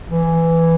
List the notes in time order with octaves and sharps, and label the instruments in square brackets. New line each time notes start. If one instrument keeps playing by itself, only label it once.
[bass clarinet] E3